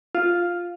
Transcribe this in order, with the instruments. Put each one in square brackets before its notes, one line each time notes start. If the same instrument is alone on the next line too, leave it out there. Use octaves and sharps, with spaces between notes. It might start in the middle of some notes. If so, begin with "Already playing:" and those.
[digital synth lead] F4